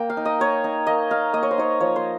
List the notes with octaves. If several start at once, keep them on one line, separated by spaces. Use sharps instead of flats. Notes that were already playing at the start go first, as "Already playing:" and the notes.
Already playing: A#3 G5
F5
D#4
D#5
A#3 C#5
D#4
A#3 D#5
D#4 F5
A#3 D#5
C#5
C5
D#4 C#5
F3 C#5
C5